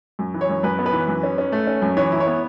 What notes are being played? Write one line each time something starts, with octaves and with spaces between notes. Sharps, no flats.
F#2
E3
C#5
F#2
F#2 B4
B3
B4
E3
F#2
C#4
C#4
A3
C#4
F#2
E3 C#5
E4
C#5
B3